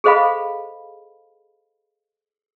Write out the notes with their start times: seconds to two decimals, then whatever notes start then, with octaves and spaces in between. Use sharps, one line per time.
0.04 G#4 A4 C5 D#5 F5 B5